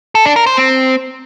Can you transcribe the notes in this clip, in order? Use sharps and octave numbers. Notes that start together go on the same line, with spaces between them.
A4
D4
A#4
C5
C4